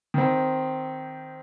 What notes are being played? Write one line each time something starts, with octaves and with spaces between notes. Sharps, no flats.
D#3 C4